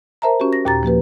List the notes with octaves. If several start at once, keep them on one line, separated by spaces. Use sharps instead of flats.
A#4 C5 E5 A5 A#5
C#4 F#4 G4
A#6
D#2 A#2 G4 A#5 A6
F3 A#3 G4 B4